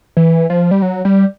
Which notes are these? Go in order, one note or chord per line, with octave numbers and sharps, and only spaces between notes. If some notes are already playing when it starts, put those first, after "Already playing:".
E3
F3
G3
F#3
G3